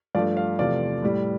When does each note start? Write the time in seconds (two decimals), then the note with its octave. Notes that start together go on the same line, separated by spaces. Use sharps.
0.15 G2 F3 A3 D5 F5
0.37 D5 F5
0.58 E2 C3 F3 A3 D5 F5
1.02 A2 G3